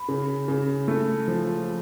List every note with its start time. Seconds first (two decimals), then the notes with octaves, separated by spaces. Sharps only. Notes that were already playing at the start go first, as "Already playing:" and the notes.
Already playing: B5
0.08 C#3
0.48 C#3
0.88 A3
1.28 F3